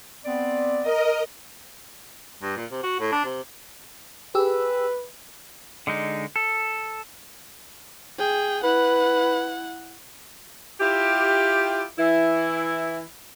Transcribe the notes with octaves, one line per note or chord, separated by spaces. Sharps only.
B3 C4 D5
A#4 D#5
G2
A#2
C3
F#4
A2
D4
C3
G4 G#4 B4 E6
D3 G#3 D#4
A4
G#4 G5
E4 B4 F#5
E4 F4 G4
E3 E4